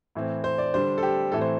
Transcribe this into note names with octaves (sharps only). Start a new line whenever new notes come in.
A2 E3 C4
C5
D5
D3 G3 D4 C5
A4
G4
A2 E3 A3 C4 A4
C5